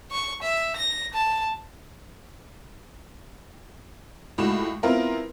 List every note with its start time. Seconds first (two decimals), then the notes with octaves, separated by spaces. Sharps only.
0.11 C#6
0.41 E5
0.76 A#6
1.13 A5
4.38 C#2 A2 F#4 E7
4.83 B3 C4 E4 F4 A#4